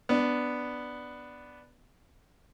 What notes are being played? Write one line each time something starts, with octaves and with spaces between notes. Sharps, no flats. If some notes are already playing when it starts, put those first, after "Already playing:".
B3 D4